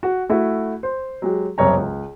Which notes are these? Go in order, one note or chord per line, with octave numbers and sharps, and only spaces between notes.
F#4
A3 E4 F#4
C5
F#3 G#3 G4
F#1 C2 C#5 A#5
C#2